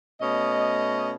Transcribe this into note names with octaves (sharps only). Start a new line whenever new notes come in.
B2 A3 C#4 D#5